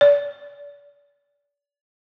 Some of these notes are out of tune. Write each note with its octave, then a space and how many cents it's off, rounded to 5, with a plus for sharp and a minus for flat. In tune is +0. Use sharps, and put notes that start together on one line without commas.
D5 -35